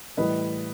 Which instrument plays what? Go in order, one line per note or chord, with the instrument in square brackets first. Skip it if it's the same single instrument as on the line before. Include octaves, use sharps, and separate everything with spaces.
[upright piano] A2 E3 G3 B4 D#5